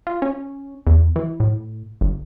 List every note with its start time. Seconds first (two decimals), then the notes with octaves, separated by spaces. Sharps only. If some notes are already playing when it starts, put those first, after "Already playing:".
0.07 F4
0.22 C#4
0.87 E2
1.16 E3
1.40 A2
2.01 G1